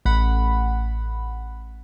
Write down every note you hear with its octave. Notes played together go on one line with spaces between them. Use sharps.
A1 F#5 B5